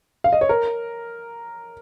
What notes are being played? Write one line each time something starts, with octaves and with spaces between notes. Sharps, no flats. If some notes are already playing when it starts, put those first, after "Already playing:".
F5
D#5
C#5
A#4